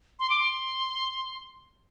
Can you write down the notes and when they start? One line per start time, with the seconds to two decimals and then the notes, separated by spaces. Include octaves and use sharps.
0.19 C6
0.30 D6
0.40 C6